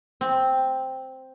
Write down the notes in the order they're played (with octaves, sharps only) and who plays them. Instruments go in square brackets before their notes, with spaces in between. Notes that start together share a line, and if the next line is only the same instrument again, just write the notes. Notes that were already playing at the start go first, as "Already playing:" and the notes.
[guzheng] C4